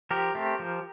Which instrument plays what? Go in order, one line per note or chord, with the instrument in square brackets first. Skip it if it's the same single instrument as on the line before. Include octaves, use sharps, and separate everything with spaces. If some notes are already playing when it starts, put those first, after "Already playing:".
[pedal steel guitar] F3 G4 A#4
A3 C4
F3